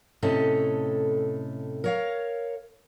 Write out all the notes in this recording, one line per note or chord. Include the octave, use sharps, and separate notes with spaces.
A2 C3 C#4 A4 D#5
A#4 C#5 F5